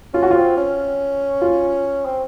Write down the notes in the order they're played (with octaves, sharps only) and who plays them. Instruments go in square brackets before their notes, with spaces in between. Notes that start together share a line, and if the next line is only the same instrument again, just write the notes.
[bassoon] C#4 [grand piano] F4
[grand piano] F#4
F4
[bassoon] C4
C#4
[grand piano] F4
[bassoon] C4